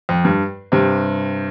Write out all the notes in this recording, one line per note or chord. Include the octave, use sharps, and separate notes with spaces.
F2
G2
G2 C3